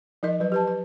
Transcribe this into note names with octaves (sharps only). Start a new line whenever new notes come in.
F3 D#4 A#4 D#5
F#3 B4
G4 B4 A5
B4